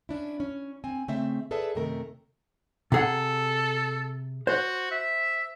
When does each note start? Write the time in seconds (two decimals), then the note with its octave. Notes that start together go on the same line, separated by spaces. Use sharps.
0.09 C#4 D4 E4
0.40 C#4
0.84 C4 G#5
1.08 C#3 A3 C4 E5
1.51 G#4 A4 B4 D5 E5 A5
1.75 F#2 C3 D#3 A3 A#4
2.92 C3 G#4 A4 F#5
4.47 F#4 C5
4.91 E5